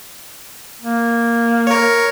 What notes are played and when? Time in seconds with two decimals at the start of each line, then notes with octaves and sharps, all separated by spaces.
0.82 A#3
1.67 A#4 C#5